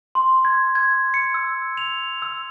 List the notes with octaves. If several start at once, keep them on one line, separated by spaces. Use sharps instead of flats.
C6
G#6
G#6
C#7
E6
F7
E6